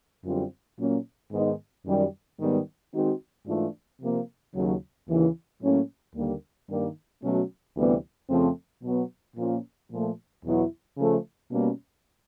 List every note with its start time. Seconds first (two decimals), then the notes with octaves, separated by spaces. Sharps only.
0.24 F#2 D3 G3 C4 F4
0.78 A#2 F#3 A#3 C#4
1.32 G#2 D#3 G#3 B3 D#4
1.85 F#2 D#3 G3
2.39 G#2 D#3 G3 B3
2.93 D#3 G#3 C4 D#4 F#4
3.46 G#2 E3 A3 D4 F4
4.00 C3 F3 A#3
4.54 D#2 C#3 F#3
5.07 D#2 C#3 E3
5.61 A2 F#3 A#3 C#4
6.14 D#2 D3 G3 A#3
6.68 G2 D#3 G3 A#3
7.22 B2 F#3 A3 C#4 F#4
7.75 D2 C3 E3 G3 B3
8.29 F2 C#3 F3 A3 C4
8.83 B2 F#3 B3
9.36 A#2 F3 A#3 C#4 F4
9.90 A#2 F3 A3
10.44 E2 B2 F#3 B3 E4
10.97 C#3 F3 A3
11.51 B2 G3 A#3 C#4